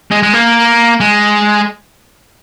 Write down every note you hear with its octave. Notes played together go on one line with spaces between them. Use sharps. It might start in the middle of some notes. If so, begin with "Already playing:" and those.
G#3
G#3
A#3
G#3